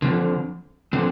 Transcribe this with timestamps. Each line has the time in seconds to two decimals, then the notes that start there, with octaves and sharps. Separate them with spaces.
0.02 D3 F3 C4
0.93 D3 F3 C4